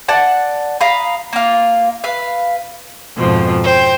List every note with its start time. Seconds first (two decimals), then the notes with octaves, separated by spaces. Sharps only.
0.08 D5 F#5 A5
0.81 F5 A#5 B5 D#6
1.33 A#3 F4
2.04 B4 F5
3.17 F2 G#2 B2 F3
3.64 C5 G5